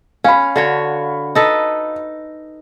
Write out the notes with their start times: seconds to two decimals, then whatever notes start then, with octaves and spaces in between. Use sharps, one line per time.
0.24 C#4 F5 B5
0.56 D3 F#4 C#5
1.35 D#4 A4 B4